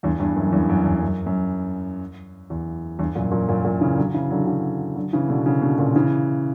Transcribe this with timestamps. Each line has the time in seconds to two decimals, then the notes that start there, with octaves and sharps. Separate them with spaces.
0.03 E2 G2
0.19 E2 G2
0.36 F#2
0.47 F#2
0.52 E2 G2
0.69 F#2
0.85 E2
1.02 F#2
1.26 F#2
2.50 E2
2.99 E2 G2
3.15 F#2 A#2
3.31 F#2 A#2
3.48 F#2 A#2
3.65 F#2 A#2
3.81 C#3 E3
3.98 D3 F#3
4.14 C#3 E3
4.31 D3 F#3
4.47 C#3 E3
4.96 D3 F#3
5.13 C#3 E3
5.29 B2 D3
5.46 C#3 E3
5.62 B2 D3
5.78 A#2 C#3
5.96 C#3 E3